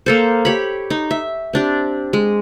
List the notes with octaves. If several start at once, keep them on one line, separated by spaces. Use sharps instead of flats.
A#3 A4 C5
G4 C#5 B5
D#4
E5
C4 D4 G4
G#3